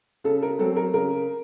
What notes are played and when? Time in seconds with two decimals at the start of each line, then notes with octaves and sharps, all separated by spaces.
0.24 C#3 A4
0.42 A#4
0.59 F#3 A3 C4 A4
0.76 A#4
0.94 C#3 A#4